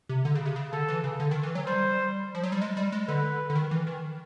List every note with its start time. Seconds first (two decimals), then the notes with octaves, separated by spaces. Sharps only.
0.09 C3
0.25 D3
0.35 C#3
0.46 C3
0.56 C#3
0.72 D3 A4
0.88 E3
1.04 C#3
1.20 D3
1.31 D#3
1.43 E3
1.55 F#3
1.67 G3 C5
2.35 F3
2.43 F#3
2.52 G3
2.61 G#3
2.77 G3
2.92 G#3
3.08 D3 B4
3.50 D3
3.56 D#3
3.71 E3
3.87 D#3